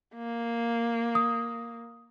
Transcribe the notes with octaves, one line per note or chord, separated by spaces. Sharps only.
A#3
D#6